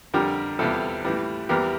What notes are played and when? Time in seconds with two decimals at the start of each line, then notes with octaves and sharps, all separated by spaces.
0.14 F2 D3 G3 G4 A#4
0.59 E2 C3 G3 F4 A4
1.05 A2 E3 G3
1.49 E2 E3 G3 G4 A#4